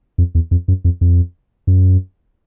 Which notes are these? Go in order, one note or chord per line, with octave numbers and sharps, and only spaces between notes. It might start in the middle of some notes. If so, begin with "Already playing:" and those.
F2
E2
F2
F#2
F2
F2
F#2